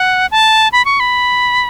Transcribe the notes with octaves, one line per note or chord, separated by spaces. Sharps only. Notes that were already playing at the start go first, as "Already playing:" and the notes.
Already playing: F#5
A5
B5
C#6
B5